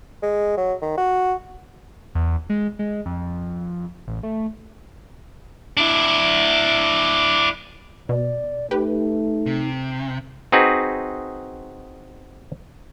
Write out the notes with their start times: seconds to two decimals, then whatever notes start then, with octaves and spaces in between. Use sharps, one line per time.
0.23 G#3
0.57 F#3
0.82 D#3
0.98 F#4
2.15 E2
2.50 G#3
2.79 G#3
3.06 F2
4.07 A1
4.23 A3
5.77 D4 E4
8.09 B2 D5
8.71 A3 D#4 G4 B4
9.46 C3
10.52 C4 D#4 F#4 G#4 B4